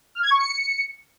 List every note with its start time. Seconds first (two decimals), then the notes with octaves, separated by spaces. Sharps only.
0.15 F6
0.23 G#6
0.31 C#6
0.38 C#7